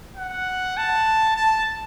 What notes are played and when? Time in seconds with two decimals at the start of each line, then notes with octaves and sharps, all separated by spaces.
0.16 F#5
0.77 A5
1.36 A5